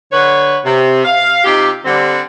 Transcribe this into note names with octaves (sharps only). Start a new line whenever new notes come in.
D3 B4 C#5
C3
F5
C3 D#4 F4 G4
D3 G3 C4